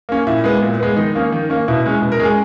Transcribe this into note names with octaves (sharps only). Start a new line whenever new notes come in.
A#3 C#4
A#2 E4
G#3 B3
A#2
G#3 B3
D#3 D#4
A#3 C#4
D#3
A#3 C#4
B2 E4
G#3 C#4
B2
A#4
G#3 C#4 G#4